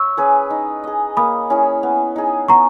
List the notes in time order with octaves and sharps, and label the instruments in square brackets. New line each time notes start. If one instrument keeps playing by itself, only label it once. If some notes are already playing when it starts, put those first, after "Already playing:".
Already playing: [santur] C#5 E5 [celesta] C#6 E6
[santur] C#4 G#4 B4
D#4
G#4 D#5
[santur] A#3 [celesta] B5 D#6
[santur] C#4 E4 G#4
B3
D#4 G#4
[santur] B3 [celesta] A#5 C#6